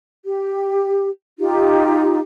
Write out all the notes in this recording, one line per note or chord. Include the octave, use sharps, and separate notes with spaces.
G4
D#4 F4 G4